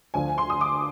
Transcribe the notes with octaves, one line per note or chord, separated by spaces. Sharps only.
D2 D3 F3 G#5
C6
D#6
D6